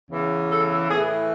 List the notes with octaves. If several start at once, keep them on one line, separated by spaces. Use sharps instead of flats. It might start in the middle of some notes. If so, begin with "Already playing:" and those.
E2 C#3 E3
A4
A2 E3 G#4